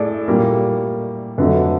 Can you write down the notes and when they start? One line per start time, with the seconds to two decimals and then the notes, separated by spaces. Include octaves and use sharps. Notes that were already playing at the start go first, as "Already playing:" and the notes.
Already playing: A2 G#4 A4 D5
0.28 A#2 G3 A#3
1.38 F2 D3 F#3 A3 B4